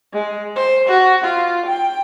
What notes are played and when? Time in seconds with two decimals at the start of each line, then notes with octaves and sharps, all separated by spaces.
0.13 G#3
0.56 C5
0.88 F#4
1.24 F4
1.66 G5